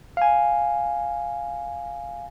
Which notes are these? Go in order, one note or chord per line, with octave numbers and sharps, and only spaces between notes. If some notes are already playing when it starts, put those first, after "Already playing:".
F5 G#5